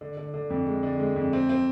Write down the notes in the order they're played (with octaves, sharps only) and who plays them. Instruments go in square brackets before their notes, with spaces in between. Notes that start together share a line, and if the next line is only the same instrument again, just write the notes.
[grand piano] D3
D3
D3
F2
G#3
D3
G#3
F2
C4
C4